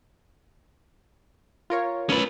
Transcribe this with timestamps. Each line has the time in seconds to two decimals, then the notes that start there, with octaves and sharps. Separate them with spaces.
1.70 F4 A#4 C#5
2.10 C#4 B4